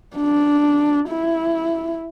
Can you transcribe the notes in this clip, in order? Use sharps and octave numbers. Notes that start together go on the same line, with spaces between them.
D4
E4